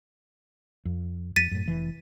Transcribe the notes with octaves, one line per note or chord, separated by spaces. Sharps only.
F2
F2 A6 B6 D#7
F#2 A2
F1 E3